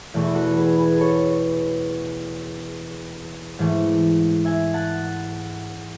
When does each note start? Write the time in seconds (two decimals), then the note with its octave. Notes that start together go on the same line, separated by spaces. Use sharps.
0.14 E2 B2 A3
0.25 B4
0.35 F#4 A4
0.56 G#4 B4
0.78 G#4 B4
1.00 A4 C#5
3.59 G#2 E3 A3
4.45 E5 G#5
4.74 F#5 A5